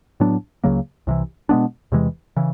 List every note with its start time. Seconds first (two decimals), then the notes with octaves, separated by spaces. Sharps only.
0.20 A2 F#3 B3 D4
0.64 C#2 C#3 F#3 A#3
1.07 C2 C3 E3
1.49 B2 G#3 B3 D4
1.92 E2 C3 E3 G#3
2.36 C#3 E3